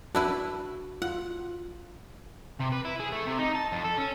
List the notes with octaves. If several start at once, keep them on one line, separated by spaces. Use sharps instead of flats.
D4 E4 F#4 B4
F4 F#5
C3
B4
E4
G#4
A3
C3
D#4
A5
F2
A4
C#4